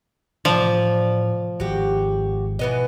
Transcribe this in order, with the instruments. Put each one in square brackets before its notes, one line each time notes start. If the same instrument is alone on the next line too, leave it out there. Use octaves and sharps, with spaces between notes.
[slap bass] A2 C3 E3 [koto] F3 [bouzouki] D5
[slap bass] G#1 [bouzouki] F#4 G4
[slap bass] B2 [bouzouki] E3 B3 D#5